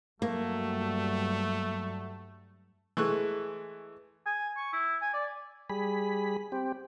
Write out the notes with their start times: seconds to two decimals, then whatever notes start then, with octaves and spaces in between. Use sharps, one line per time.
0.22 G2 F#3 G3 A3 A#3
2.97 E3 G#3 A3 C#6 F#6
4.26 G#5
4.57 C#6
4.73 E4
5.01 G#5
5.13 D5
5.70 G3 G#4 B5
6.52 C4 G4